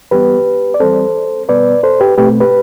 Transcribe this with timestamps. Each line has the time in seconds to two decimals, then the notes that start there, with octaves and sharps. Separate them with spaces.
0.11 E3 G3 B3 G4 B4
0.74 D5
0.80 E3 G3 C4 A4 C5
1.49 B2 G3 B3 B4 D5
1.83 A4 C5
2.00 G4 B4
2.17 B2 A3 C4 G4 B4
2.40 G4 B4